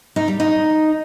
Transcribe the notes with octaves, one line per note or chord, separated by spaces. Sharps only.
D#4
G3
D#4